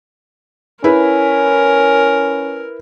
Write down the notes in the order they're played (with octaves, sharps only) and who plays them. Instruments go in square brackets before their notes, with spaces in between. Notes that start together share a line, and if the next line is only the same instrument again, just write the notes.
[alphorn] C#4 [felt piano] E4 B4 [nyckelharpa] A#4